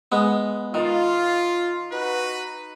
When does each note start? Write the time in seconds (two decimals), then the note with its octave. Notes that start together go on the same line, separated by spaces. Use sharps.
0.12 G#3 B3
0.74 D#3 F4
1.92 D#4 F#4 B4